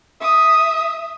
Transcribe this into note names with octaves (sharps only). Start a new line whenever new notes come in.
E5 D#6